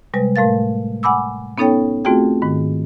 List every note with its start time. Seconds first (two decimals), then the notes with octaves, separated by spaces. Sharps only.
0.14 C3 G3 G#3 B4
0.36 A2 A3 A#4 F5 A6
1.03 F#5 G#5 B5 D6 E6
1.58 B3 C#4 D#4 A4 C#5 G5
2.05 A3 C4 F4 F#4 G#4 G5
2.42 G#2 D#3